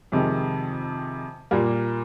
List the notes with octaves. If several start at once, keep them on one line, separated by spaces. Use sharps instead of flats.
F2 C3 D#3 G#3
A#2 G3 A#3